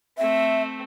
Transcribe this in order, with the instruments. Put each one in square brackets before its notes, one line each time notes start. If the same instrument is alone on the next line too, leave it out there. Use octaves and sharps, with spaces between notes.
[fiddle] A3 C4 [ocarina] E5